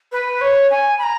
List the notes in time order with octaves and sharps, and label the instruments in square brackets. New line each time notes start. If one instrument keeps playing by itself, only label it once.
[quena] B4
C#5
G#5
B5
A#5